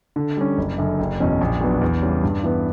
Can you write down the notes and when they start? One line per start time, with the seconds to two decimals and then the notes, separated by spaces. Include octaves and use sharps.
0.16 D3
0.37 G3 C#4
0.58 F#1
0.78 F#2 D3
0.99 F#1
1.20 E2 B2 F#3 C#4
1.41 A#1
1.61 A#2 F#3 B3 D4
1.81 E2
2.02 C#3 G3 C#4
2.23 G2
2.44 E3 B3